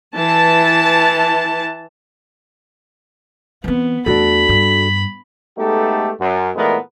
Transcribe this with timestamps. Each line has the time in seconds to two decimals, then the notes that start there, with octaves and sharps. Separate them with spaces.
0.15 E3 A5
3.64 E3 B3 C4
4.06 E2 A3 D4 F#4 A4 B5
4.49 G2
5.58 G#3 A3 B3 D#4 G4 A4
6.20 F#2
6.56 A#2 E3 G#3 A3 B3 A#4